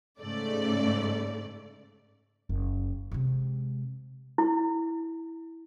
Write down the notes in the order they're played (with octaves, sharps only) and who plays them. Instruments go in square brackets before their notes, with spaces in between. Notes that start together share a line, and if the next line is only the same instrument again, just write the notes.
[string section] G#2 C#3 A3 D5
[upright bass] F#1
C3 G#3
[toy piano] E4